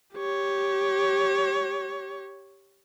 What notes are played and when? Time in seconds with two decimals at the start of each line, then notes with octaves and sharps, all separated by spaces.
0.15 G4 C#5